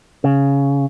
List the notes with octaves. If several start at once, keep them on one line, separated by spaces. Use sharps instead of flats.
C#3